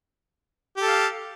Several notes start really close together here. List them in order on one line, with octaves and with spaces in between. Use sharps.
G4 A4 F5